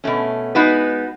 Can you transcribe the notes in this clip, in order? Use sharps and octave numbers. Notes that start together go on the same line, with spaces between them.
B2 A3 C#4
G#3 B3 D#4 F#4 B4